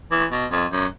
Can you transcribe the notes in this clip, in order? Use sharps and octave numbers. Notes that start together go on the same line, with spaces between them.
E3
B2
F2
F#2